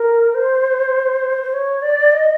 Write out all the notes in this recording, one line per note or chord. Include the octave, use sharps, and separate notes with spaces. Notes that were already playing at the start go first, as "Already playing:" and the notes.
Already playing: A#4
C5
C5
C#5
D5
D#5